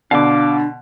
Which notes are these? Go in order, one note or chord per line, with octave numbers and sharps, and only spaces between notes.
B2 D3 D4 F5 D6